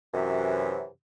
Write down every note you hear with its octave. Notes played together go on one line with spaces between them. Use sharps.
F#2 C3 E3